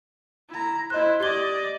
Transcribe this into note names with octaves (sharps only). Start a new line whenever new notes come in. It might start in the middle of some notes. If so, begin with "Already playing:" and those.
E4 A#5
E4 C5 D#5 F#6
G4 D5 D#5 G#6 G7